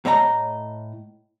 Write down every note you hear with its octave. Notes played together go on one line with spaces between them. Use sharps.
A2 A3 C#5 D#5 A#5